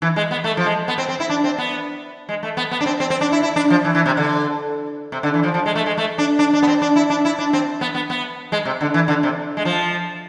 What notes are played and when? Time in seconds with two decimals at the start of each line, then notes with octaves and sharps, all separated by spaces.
0.02 E3
0.16 G#3
0.31 B3
0.44 A3
0.57 F3
0.66 G#3
0.88 B3
0.98 C4
1.08 C4
1.20 E4
1.29 D4
1.44 C4
1.58 B3
2.29 G#3
2.43 A3
2.57 B3
2.71 B3
2.81 D4
2.86 C4
3.00 C4
3.10 C4
3.21 D4
3.32 E4
3.43 E4
3.56 D4
3.70 F3
3.85 E3
3.95 E3
4.06 C3
4.17 D3
5.12 C3
5.23 D3
5.34 E3
5.43 F3
5.54 F3
5.66 G#3
5.75 A3
5.86 G#3
5.97 A3
6.18 D4
6.39 D4
6.54 D4
6.62 B3
6.67 C4
6.82 D4
6.96 E4
7.10 D4
7.25 E4
7.39 D4
7.53 C4
7.81 B3
7.95 B3
8.10 B3
8.52 G#3
8.65 C3
8.81 D3
8.94 E3
9.08 D3
9.23 C3
9.57 G#3
9.65 F3